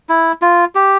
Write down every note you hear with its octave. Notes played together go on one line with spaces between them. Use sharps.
E4
F4
G4